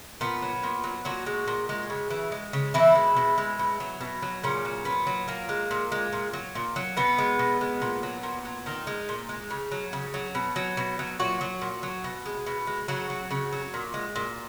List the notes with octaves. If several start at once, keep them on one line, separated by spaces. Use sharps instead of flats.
A#2 B3
F#3
A#2
F#3
A#2 F#3 F#4
G#3
A#2
G#3
C#3
E3
G#3
C#3
B2 E3 E4
G#3
B2
G#3
B2
F#3
B2
F#3
A#2 C#3 C#4
F#3
A#2 B3
F#3
A#2 A#3
G#3
A#2
G#3
A#2
F#3
A#2
F#3
B2 B3
G#3
B2
G#3
A#2
F#3
A#2
F#3
A#2 D#3 D#4
G#3
A#2
G#3
C#3
F#3
C#3
F#3
B2
F#3
B2
F#3
A#2 F#3 F#4
F#3
A#2
F#3
B2
G#3
B2
G#3
C#3 F#3 F#4
F#3
C#3
F#3
A#2
G#3
A#2